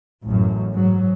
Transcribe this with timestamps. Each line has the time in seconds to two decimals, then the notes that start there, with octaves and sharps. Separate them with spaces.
0.23 A1 F#2
0.72 G#2 F#3